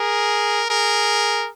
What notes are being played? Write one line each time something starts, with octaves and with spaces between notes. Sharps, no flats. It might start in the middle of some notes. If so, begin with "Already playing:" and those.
Already playing: G#4 A#4
G#4 A#4